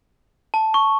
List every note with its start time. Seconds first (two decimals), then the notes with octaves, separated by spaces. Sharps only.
0.54 A5
0.74 C#6